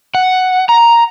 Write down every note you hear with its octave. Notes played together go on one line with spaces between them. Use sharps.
F#5
A#5